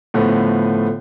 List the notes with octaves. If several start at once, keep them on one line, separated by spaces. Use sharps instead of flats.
A2 D3 F3 A3 B3